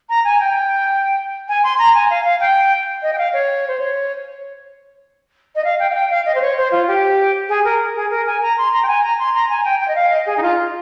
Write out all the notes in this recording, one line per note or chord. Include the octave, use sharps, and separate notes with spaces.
A#5
G#5
G5
G#5
C6
A#5
G#5
F5
F5
G5
D#5
G5
F5
C#5
C5
C#5
D#5
F5
G5
F5
G5
F5
D#5
C5
C#5
C5
F4
G4
G#4
A#4
G#4
A#4
G#5
A#5
C6
A#5
G5
G#5
A#5
C6
A#5
G#5
G5
G5
D#5
F5
D#5
G#4
D#4
F4